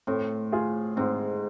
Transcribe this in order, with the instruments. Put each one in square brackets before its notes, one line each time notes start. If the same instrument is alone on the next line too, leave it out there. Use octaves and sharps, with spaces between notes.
[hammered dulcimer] A2 [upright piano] C4
[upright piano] F4 G#4
[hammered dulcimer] G#2 [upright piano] C4